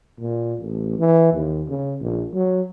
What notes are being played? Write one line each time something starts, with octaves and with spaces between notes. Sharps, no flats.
A#2
A1
E3
D#2
C#3
A#1
F#3